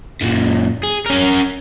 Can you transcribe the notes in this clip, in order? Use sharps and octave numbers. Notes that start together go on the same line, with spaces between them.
F#2 A#2
G#4
C#4 A#4